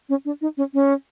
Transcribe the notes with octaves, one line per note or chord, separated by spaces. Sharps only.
C#4
D4
D#4
C#4
C#4